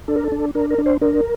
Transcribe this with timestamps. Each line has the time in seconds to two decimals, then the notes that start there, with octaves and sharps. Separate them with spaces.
0.08 D4 A4
0.16 A#4
0.24 A4
0.32 D4
0.55 D4 A#4
0.70 A#4
0.78 D4
0.86 C5
1.01 D4 A#4